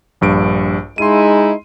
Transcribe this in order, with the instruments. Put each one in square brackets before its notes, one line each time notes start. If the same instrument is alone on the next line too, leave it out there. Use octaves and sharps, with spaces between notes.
[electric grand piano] A#1 G2 D7
[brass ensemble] G#3 D#4 E4 [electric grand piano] C6 D#7